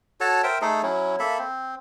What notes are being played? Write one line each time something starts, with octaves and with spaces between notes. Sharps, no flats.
F#4 A4 C#5 A5
A#4 C5 E5 G5
A3 D#4 G#4 A4
F#3 C#4 E4
A#3 A4 E5 B5
C4